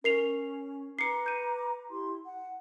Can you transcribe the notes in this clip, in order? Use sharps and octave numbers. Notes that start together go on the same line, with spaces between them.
C#4 A#4 C7 F7
B4 A#5 D6 C7 C#7
G6 D#7
E4 G4 C6
F#5